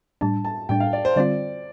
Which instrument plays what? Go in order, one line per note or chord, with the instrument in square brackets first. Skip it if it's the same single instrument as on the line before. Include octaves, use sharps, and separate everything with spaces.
[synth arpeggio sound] A2 G3 D4 [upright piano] A5
[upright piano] A5
[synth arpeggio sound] A2 G3 D4 [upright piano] G5
[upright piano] F5
D5
C5
[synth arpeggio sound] D3 G3 C4 F4 [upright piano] D5